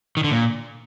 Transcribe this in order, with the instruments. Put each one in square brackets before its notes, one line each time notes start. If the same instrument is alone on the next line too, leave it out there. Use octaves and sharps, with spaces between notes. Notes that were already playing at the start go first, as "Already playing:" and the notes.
[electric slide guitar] D#3
D3
A#2